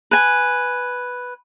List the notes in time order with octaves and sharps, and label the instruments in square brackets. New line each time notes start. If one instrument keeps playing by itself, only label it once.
[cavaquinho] B4 G#5